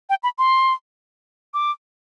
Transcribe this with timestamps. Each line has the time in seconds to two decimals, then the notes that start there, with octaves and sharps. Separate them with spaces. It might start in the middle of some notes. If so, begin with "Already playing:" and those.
0.09 G5
0.23 B5
0.38 C6
1.54 D6